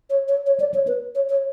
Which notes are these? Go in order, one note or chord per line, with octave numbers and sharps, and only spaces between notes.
C#5
C#5
C#5
D5
C#5
B4
C#5
C#5